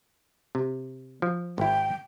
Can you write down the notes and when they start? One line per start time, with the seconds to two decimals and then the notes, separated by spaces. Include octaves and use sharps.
0.55 C3
1.22 F3
1.58 G#1 E4 G5